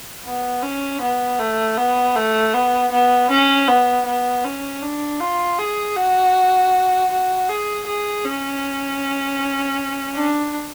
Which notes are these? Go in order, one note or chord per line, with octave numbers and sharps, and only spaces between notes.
B3
C#4
B3
A3
B3
A3
B3
B3
C#4
B3
B3
C#4
D4
F4
G#4
F#4
F#4
G#4
G#4
C#4
D4